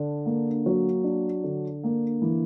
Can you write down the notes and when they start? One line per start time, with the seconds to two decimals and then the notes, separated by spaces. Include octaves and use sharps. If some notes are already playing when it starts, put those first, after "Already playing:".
Already playing: D3 D4
0.26 A#3
0.66 F#3
1.04 D4
1.43 D3
1.84 A#3
2.22 E3